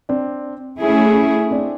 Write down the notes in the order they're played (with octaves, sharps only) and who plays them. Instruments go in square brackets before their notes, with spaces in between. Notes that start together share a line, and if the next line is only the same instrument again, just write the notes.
[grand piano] C4 D4
[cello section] A3 C#4 E4 G#4
[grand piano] C4 D4